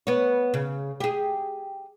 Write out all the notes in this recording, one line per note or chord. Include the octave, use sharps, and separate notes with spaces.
B3 C#5
C#3
G4 G#4